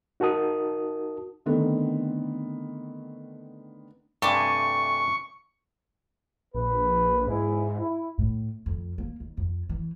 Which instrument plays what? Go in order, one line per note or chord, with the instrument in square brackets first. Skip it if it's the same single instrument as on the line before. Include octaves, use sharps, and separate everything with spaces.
[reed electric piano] D#4 F#4 A#4 A5 D#6
[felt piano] D3 D#3 A3 B3 C4
[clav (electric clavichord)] G2 C3 [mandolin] A3 G#5 D6 [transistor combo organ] C#6
[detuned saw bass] A#1 [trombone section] B4
[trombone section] E2 E4 G#4 [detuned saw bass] G#2
[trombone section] E4
[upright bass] A2
F2
A#3
D#2
F2
E3